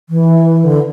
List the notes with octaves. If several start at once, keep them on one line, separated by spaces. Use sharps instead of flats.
E3
D3